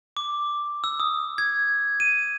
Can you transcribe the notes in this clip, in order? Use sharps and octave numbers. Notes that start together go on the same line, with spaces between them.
D6
E6
D#6
G#6
D#7